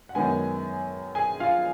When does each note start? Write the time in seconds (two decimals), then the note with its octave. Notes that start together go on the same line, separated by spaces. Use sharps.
0.09 F#5
0.15 F#2 D#3 G#3 B3 G#4 G#5
1.15 G#4 G#5
1.40 F4 F5